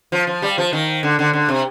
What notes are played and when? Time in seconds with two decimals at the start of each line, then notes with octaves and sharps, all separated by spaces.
0.12 F3
0.27 F3
0.42 G3
0.58 F3
0.73 D#3
1.03 D3
1.19 D3
1.33 D3
1.49 C3